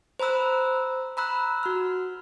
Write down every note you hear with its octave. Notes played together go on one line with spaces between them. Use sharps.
C5 A#5 B5 E6 F#6
A#5 B5 E6 F#6
F#4 F6